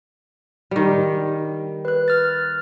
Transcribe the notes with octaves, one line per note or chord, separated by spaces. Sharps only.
D#3 G3
B4 F#6
F6 A6